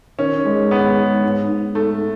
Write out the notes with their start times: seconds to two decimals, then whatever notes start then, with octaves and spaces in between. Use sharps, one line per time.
0.18 D#3 C#4
0.45 G#3
0.71 G#2 B3
0.97 G#3
1.23 G#2
1.49 G#2
1.75 G#2 A3